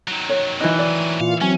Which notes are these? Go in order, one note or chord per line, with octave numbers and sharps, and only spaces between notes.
D#3 F#3
C#5
E3 D#4 D#5 F#6
D5 D#7
A#2 F4 F5 C#7
F#3 C4 C#4 G#5